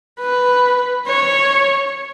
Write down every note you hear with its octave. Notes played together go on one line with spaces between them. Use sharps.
B4
C#5